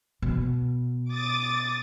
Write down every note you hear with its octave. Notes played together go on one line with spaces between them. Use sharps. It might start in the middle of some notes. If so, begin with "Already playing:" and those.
B2
D6 D#6 A6